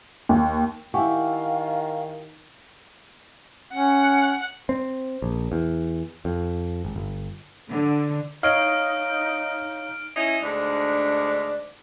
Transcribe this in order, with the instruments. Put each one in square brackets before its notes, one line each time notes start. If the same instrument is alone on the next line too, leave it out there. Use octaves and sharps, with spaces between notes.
[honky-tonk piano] D#2
[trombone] D#3 [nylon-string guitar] E4 G4 [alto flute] F5 [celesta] F#5 G#5 C#6
[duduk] C#4 [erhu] F#5
[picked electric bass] C4
A#1
E2
F2
G#1
G1
[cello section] D3
[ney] D#4 [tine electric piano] C#5 F5 [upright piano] D#5 [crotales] F6 D7 G7
[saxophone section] C#4 D#4 E4
D2 G#2 D4